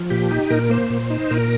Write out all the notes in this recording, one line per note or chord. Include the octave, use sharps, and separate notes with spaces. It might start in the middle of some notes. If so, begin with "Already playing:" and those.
Already playing: F3
A#2 G4
D#4
A#2 A#4
A#3 C5
A#2
D#4
A#2 A#4